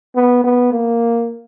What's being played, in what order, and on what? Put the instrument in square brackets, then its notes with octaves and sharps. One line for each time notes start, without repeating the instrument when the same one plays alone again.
[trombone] B3
B3
A#3